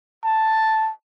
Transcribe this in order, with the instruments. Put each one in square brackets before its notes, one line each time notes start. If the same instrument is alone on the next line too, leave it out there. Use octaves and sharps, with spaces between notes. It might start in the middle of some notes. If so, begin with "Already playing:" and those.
[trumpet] A5